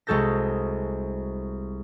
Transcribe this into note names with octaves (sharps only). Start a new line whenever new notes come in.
C2 G#3 F#4 A4 G6 A#6